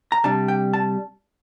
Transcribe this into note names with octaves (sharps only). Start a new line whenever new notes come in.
A#5
C3 G3 D4 A5
G5
A5